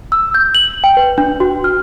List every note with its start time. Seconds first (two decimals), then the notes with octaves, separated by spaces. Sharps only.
0.12 E6
0.34 G6
0.55 F#7
0.84 G5
0.97 B4
1.18 D4
1.40 F#4
1.64 F6